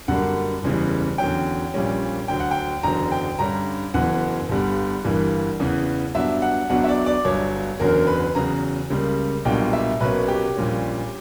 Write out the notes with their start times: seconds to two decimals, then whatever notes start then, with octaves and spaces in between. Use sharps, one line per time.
0.08 F#2 D3 G3 A#3 D4 F#5
0.63 F#1 E2 C#3 E3 G3
1.18 E2 D3 F#3 C#4 G5
1.74 A#1 A#2 G3 C#4
2.28 D2 D3 F#3 G5
2.40 F#5
2.51 G5
2.83 F#1 E2 D3 F#3 A#5
3.11 G5
3.39 G2 D3 G3 C#4 A#5
3.94 F#1 F#2 E3 B3 F#5
4.49 G1 G2 D3 G3 B3
5.04 G1 G2 E3 G3 A#3
5.60 E2 C#3 E3 B3
6.15 G2 F#3 B3 D4 E5
6.42 F#5
6.70 B1 B2 F#3 B3 D4 F#5
6.84 E5
6.88 D5
7.06 D5
7.25 G1 G2 F#3 C#5
7.80 F#1 E2 D3 F#3 C#4 A#4
8.07 B4
8.35 E2 C#3 F#3 A#5
8.90 C#2 C#3 G3 A#3
9.45 B1 A#2 G3 B3 D4 G5
9.73 E5
10.00 B1 B2 A#3 C#4 B4
10.28 G4
10.55 A#1 A#2 G3 C#4